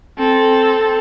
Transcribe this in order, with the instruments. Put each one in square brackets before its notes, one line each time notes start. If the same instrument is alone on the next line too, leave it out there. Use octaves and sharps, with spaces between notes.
[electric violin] C4 A4